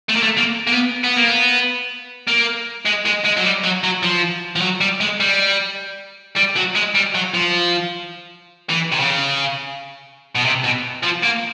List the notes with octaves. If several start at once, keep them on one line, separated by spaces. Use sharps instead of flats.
A3
A#3
A3
A#3
A#3
B3
B3
A#3
B3
A#3
G#3
G#3
G#3
F#3
G3
F#3
F#3
F3
F3
F#3
G3
G#3
G3
G3
F#3
G#3
G3
F#3
F3
E3
C3
C#3
B2
C3
B2
F3
A#3